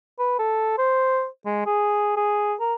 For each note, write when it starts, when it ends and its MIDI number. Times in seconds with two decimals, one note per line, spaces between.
0.19 0.39 71
0.39 0.77 69
0.78 1.26 72
1.45 1.62 56
1.66 2.12 68
2.17 2.54 68
2.60 2.74 70